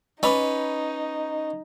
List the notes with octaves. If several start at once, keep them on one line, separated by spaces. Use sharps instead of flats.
C#4 D#4 B4 D#5 B5 D6